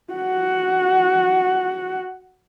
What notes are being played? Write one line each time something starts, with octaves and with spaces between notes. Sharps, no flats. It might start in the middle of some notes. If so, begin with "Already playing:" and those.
F#4 F#5